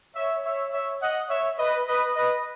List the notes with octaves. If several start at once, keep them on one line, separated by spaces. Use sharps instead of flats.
C#5 E5
C#5 E5
C#5 E5
D#5 F#5
C#5 E5
B4 D#5
B4 D#5
B4 D#5